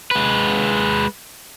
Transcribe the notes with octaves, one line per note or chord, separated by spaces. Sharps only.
G#3 B4